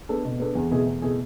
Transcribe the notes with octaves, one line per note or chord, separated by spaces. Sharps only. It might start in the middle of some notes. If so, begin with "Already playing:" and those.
B3 D4 A4
B2
B3 D4 A4
E2
B2 A3 E4 G#4
E2
B2 A3 E4 G#4